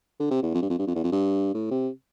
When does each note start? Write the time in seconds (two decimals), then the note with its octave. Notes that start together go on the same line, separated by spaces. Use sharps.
0.20 D3
0.31 C3
0.42 E2
0.54 F2
0.62 G2
0.70 F2
0.79 G2
0.87 F2
0.95 E2
1.04 F2
1.12 G2
1.54 A2
1.71 C3